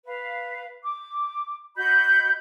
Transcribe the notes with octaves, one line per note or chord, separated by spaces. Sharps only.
B4 F5
D6
F#4 D#5 B5 G6